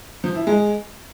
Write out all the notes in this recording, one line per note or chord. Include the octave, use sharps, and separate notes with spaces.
F3
E4
G#3